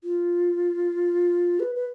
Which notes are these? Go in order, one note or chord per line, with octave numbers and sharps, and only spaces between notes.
F4
B4
B4